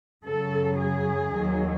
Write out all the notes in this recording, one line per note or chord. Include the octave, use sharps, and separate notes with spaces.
F#2 C#3 F#3 A4
G#4
D#2 D#3 F#3